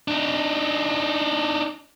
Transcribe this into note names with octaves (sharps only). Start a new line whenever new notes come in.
D4 D#4